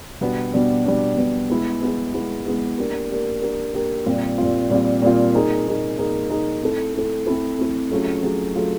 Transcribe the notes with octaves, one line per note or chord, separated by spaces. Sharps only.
B2 G3 B3 D4
B2 G3 B3 D4
B2 G3 B3 D4
B2 G3 B3 D4
G#3 B3 E4 G#4
G#3 B3 E4 G#4
G#3 B3 E4 G#4
G#3 B3 E4 G#4
A#3 D4 G4 A#4
A#3 D4 G4 A#4
A#3 D4 G4 A#4
A#3 D4 G4 A#4
A#2 G3 C4 F4
A#2 G3 C4 F4
A#2 G3 C4 F4
A#2 G3 C4 F4
A#3 D#4 G#4
A#3 D#4 G#4
A#3 D#4 G#4
A#3 D#4 G#4
A3 C4 E4 A4
A3 C4 E4 A4
A3 C4 E4 A4
A3 C4 E4 A4
F#3 A3 C#4 F4 G#4
F#3 A3 C#4 F4 G#4
F#3 A3 C#4 F4 G#4